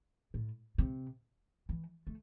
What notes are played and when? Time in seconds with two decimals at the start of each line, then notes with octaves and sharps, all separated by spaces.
0.34 A2
0.78 C3
1.69 E3
2.07 A3